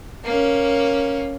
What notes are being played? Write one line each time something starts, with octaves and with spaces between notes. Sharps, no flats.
A#3 C#4